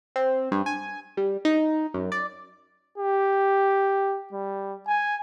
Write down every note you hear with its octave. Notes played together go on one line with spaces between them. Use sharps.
C4
G2
G#5
G3
D#4
F#2
D5
G4
G3
G#5